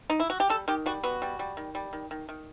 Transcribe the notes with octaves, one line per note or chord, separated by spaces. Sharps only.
D#4
E4
F#4
G4
G3 A4
D#3 G4
G3 F#4
B3 F#4
G3
G3
D#3
G3
D#3
D#3
D#3